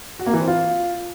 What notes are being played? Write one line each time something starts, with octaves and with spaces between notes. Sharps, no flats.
F#4
A#3
E3
C4
F4